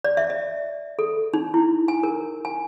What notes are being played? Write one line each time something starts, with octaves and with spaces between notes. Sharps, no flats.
D5
E5
D#5
A4
D#4
E4
G#5
A#4
G#5